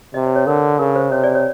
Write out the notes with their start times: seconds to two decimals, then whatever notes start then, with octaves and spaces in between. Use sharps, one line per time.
0.14 C3 D#5
0.26 C#5
0.36 C#5
0.47 D3 A#4
0.79 C#3 A#4
0.96 C5
1.12 C3 C#5
1.23 D5
1.35 C#5